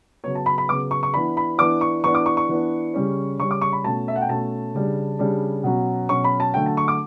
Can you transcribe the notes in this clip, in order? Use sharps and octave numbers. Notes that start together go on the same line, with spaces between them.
C#3 F#3 B3 C#5
A5
B5
B5
C#3 F#3 B3 D6
C#6
C#6
E3 B3 D4 B5
B5
E3 B3 D4 D6
C#6
E3 B3 D4 C#6
D6
C#6
C#6
E3 B3 D4
C#3 G3 C#4
C#3 G3 C#4 C#6
D6
C#6
B5
B2 A3 C#4 A5
E5
F#5
G5
B2 A3 C#4 A5
C#3 G3 D4
C#3 G3 D4
B2 F#3 C#4
B2 F#3 C#4 C#6
B5
A5
D3 F#3 A3 G5
A5
C#6
D6